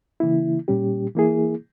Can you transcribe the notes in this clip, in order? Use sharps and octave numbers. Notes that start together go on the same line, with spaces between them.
C#3 E3 A#3 E4
A#2 G3 C#4 G4
E3 A#3 E4 G#4